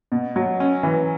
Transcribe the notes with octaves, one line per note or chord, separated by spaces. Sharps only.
B2
F#3
C#4
E3